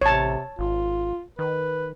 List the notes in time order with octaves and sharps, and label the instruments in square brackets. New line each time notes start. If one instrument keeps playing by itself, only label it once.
[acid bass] A1 [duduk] C3 [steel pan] C#5 A5
[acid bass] G#1 [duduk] F4
[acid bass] D#3 [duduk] B4